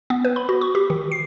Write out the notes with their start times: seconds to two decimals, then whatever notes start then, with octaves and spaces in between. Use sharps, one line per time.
0.10 B3
0.25 B4
0.36 B5
0.49 F#4
0.61 C#6
0.75 G4
0.90 D#3
1.12 C7